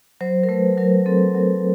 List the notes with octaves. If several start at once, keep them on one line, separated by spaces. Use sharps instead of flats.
F#3 C5
A#4
A3 B4
F#3 A#4
C4 A4
F#3